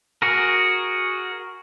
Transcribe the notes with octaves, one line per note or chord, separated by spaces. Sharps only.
F#4 G#4 A#4